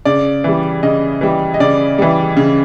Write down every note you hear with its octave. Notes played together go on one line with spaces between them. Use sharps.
C#3 D5
E3 G3
C#3 D#5
E3 G3
D#5
C#3 D5
E3 G3
C#3